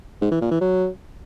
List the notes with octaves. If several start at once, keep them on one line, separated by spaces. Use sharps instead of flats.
G#2
E3
A#2
E3
F#3